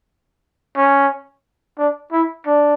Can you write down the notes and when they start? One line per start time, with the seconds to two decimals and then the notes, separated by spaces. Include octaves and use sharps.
0.76 C#4
1.78 D4
2.12 E4
2.46 D4